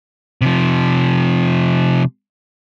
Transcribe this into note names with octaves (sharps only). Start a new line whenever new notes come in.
C3 F3